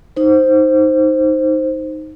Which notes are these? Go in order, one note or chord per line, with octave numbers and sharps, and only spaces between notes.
D#4 C5